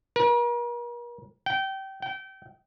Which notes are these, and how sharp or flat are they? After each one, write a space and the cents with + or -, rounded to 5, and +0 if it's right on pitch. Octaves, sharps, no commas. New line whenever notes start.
A#4 +45
G5 -25
G5 -30